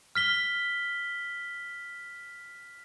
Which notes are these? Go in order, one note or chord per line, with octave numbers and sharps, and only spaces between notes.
F6 B6 G7